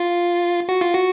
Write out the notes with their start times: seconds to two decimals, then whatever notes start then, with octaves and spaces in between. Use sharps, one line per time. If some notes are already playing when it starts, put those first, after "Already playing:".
Already playing: F4
0.69 F#4
0.81 F4
0.93 F#4